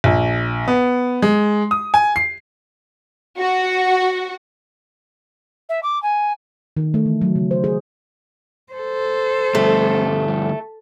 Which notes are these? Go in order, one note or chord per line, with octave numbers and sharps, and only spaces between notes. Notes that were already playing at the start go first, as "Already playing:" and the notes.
A#1
B3
G#3
D#6
G#5
C7
F#4
E5
D6
G#5
D#3
A3
E3
F#3
C#3
C5
G#4
A4 C5
D2 G2 A3